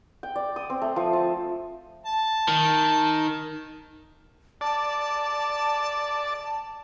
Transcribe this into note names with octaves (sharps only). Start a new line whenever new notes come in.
G5
D5
D#6
C4
A3
F3
A5
A5
D#3
D5 A5